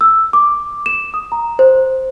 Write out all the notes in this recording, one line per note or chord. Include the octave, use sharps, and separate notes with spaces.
E6
D6
E7
D#6
A#5
C5